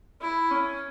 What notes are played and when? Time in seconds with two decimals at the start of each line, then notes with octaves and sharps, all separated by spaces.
0.21 E4
0.51 C#4